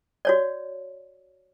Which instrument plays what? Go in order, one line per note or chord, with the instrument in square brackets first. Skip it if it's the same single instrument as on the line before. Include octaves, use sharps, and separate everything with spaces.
[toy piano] F#4 C#5 D5